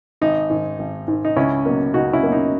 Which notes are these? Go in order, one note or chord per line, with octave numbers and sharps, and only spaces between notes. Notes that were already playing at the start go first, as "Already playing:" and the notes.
G#1 D#4
G#2 D#3
G#1
G#2 D#3
D#4
C#2 C#4 E4
B2 F#3 A#3
C#2 D#4 F#4
C#4 E4
B2 F#3 A#3
D#4